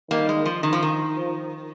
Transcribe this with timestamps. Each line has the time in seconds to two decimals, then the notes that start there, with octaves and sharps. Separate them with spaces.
0.11 D#3 G3 A#3
0.29 G#3
0.46 F3
0.63 D#3
0.73 F3
0.82 D#3
1.16 F3